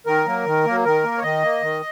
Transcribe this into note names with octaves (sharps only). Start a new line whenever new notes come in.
D#3 A#4
F#3 A#3
D#3
F#3 A#3
D#3 A#4
A#3
C#5
D#3 D#5
A#3
D#3